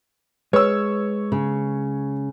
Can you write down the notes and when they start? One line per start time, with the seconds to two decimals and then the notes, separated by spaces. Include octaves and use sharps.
0.53 G#3 B4 C#5 E6
1.32 C#3